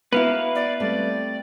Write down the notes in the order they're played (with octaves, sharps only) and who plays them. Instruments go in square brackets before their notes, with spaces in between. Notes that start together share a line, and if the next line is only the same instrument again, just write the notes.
[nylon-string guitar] A#3 F#4 [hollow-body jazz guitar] B3 E4 [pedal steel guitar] B4 F5
[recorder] D5
[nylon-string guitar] G3 A3 C4 [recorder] D5